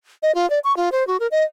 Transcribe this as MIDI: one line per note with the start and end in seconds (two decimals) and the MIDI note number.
0.23 0.34 75
0.35 0.48 65
0.50 0.59 74
0.64 0.75 85
0.77 0.89 65
0.92 1.06 72
1.07 1.17 66
1.20 1.27 70
1.31 1.43 75